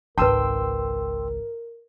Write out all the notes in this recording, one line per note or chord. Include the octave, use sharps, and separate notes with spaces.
G#1 C#2 A#4 B4 G5 A5 C6 E6